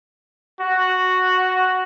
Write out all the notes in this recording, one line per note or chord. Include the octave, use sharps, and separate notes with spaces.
F#4